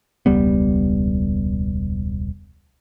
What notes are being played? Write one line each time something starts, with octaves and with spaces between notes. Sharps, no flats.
E1 C#2 G3 B3